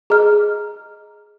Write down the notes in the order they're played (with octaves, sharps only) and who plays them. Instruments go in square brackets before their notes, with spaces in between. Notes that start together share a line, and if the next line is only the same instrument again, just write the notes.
[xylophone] G#4 D#5 A#5 F6